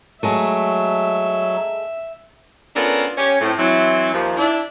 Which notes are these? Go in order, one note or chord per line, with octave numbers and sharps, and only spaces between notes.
F#3 G#3 A3 E5
B3 C#4 D4 F4 A4 A#4
C#4 G4 C#5
A2 C4
E3 F#3 C4 E4
D#2 F3
D4 E4